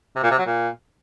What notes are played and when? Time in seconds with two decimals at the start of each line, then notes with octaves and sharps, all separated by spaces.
0.16 C3
0.24 A#2
0.31 C3
0.39 F#3
0.46 A#2